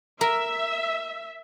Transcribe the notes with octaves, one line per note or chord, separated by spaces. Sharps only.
A#4 E5